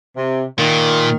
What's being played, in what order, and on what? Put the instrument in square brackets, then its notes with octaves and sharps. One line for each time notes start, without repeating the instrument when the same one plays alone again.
[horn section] C3
[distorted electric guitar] A#2 [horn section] D#3